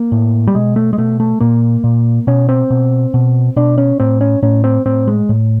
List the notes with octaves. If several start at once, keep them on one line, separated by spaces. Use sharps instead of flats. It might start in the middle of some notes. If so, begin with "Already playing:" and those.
Already playing: A#3
A2
G3
B2 G#3
A3
G#3
B2 A3
A3
A#2 A#3
A#2
B2 C#4
C4
B2
B2
B2 D4
C#4
A2 C4
C#4
A2 C#4
C4
A2 C4
G#3
A2